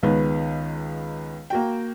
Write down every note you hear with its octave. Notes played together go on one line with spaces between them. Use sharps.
C#2 D#3 B3
A#3 F#4 G5